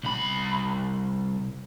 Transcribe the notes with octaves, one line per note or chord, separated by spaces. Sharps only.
C2 B5